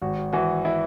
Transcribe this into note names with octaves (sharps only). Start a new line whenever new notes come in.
G#1 F#4
E3 F#4
E4